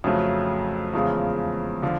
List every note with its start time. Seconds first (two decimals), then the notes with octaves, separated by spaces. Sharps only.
0.04 F2 C#3 F#3 A3
0.93 E2 C#3 F3 G#3
1.82 D3 F3